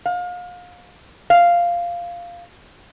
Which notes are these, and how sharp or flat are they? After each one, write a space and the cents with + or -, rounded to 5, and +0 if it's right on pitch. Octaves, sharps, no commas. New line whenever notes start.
F5 +35
F5 -5